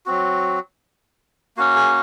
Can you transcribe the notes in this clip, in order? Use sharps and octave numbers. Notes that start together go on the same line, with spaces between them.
F#3 C4 F#4
A#3 C#4 F#4
G#4